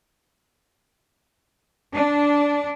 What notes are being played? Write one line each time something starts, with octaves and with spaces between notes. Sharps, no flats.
D4